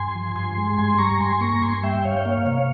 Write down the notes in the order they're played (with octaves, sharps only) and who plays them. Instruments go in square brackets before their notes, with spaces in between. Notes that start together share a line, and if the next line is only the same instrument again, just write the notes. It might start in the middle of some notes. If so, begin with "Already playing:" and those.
Already playing: [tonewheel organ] G2 G#5 C6
F3
G2 G#5 C6
G#3
G2 G#5 C6
G3 A#5 C#6
G2 G#5 C6
A#3 A#5 C#6
A#5
G2 G#5 C6
G3 E5 G5
G2 C#5 F5
G5
A#3 C#5 F5
C3 C#5 F5